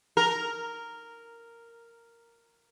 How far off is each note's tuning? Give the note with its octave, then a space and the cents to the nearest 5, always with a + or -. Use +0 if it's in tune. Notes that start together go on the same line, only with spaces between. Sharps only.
A#4 -5